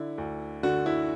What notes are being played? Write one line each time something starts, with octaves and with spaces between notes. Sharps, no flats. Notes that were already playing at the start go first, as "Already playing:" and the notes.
Already playing: D3 E4
D2
D3 F#4
E4